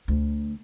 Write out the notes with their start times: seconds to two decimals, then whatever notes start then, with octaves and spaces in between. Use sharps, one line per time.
0.08 D2